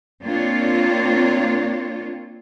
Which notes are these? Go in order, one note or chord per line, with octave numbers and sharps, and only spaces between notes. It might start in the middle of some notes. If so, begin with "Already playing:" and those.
A#3 C4 D4 F4 C#5